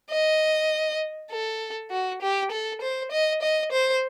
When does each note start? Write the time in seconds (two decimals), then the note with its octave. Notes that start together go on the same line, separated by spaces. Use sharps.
0.10 D#5
1.31 A4
1.91 F#4
2.22 G4
2.52 A4
2.81 C5
3.11 D#5
3.42 D#5
3.72 C5